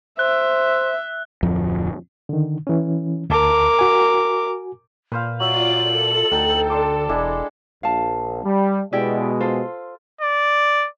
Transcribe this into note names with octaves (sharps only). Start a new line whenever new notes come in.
C5 E5 F#6
D1 F2 F3
D3 D#3
E3 C#4
D2 A#4 A5 D6
F#4 G#5
A#2 B4 C5 F5
F#3 F4 D5 E5 F#7
A4
D2 D#4 F#5 G5
D4 A5 C6 D6
E1 G#3 D4 E4
A#1 F5 A5
G3
B2 G#3 E4 G4 D5
F4 A4 C5
D5